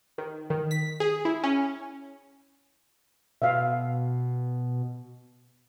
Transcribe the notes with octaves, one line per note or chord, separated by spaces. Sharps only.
D#3
D#3
B6
G#4
E4
C#4
B2 E5 F5